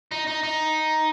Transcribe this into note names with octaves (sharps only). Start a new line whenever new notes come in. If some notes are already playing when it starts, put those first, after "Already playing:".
D#4
D#4
D#4